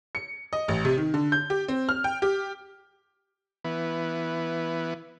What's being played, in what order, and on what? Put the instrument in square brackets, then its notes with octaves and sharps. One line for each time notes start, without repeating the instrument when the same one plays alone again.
[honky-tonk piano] C#7
D#5
A1
C3
D#3
D3
G6
G4
C4
F6
G5
G4
[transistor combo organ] E3 B3